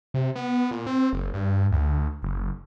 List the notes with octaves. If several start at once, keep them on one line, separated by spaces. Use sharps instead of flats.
C3
B3
A#2
C4
F#1
G2
D2
F#1